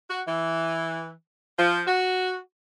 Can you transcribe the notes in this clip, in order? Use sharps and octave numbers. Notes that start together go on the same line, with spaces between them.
F#4
E3
F3
F#4